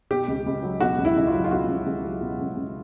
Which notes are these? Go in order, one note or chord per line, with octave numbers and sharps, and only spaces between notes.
B2 G4
C#2
C#2
F#3
B2 F#4
C#2
E4
C#2
F4
F#3
F4
B2 F#4
C#2
C#2
F#3
B2
C#2
C#2